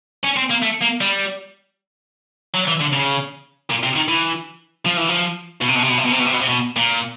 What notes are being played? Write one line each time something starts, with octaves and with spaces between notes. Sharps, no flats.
C#4
C4
A#3
A3
A#3
G3
F#3
E3
D3
C#3
A#2
C3
D#3
E3
F3
E3
F3
B2
C3
B2
C3
B2
C3
B2
C3
B2
C3
B2
C3
B2
A#2